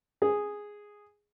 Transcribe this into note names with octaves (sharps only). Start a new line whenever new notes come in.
G#4